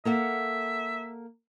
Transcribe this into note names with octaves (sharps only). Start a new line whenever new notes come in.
A#3 A4 E5 F#5